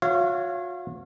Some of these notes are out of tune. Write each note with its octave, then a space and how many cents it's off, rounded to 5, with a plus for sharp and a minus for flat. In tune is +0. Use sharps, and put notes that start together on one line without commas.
F#4 -45 C#5 +0 F5 -35